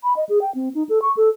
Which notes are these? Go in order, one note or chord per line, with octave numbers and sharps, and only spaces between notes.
B5
D#5
G#4
G5
C4
D#4
A4
C#6
A4